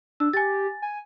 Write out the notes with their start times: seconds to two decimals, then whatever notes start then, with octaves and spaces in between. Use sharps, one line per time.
0.20 D4 E6
0.33 G4 G#5 A6
0.82 G#5